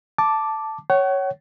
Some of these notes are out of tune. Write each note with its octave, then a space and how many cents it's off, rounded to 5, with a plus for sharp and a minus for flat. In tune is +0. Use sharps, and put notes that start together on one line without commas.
A5 +0 D6 +0
C#5 +0 F#5 +40